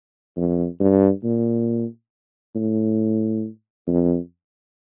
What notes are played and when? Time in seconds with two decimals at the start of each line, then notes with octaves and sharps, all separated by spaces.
0.37 F2
0.80 G2
1.24 A#2
2.55 A2
3.87 F2